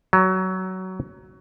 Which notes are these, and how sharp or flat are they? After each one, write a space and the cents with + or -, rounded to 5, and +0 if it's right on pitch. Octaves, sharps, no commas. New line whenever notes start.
F#3 +20